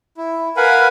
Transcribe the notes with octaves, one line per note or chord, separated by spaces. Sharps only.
E4
A#4 B4 F5 F#5 G#5 B5